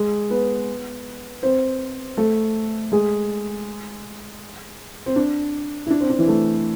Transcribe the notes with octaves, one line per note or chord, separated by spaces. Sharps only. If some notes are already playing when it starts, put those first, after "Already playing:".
Already playing: G#3 G#4
B3 B4
C4 C5
A3 A4
G#3 G#4
C4
D4
E4
D4
C4
D4
E3 E4
A3 A4